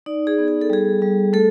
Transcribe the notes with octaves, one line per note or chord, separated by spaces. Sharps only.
D#4 D5
G#4
B3
G#4
A4
G3 G#4
G3
A3 A4